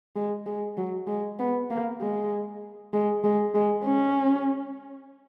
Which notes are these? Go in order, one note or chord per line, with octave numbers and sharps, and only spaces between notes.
G#3
G#3
F#3
G#3
B3
A#3
G#3
G#3
G#3
G#3
C#4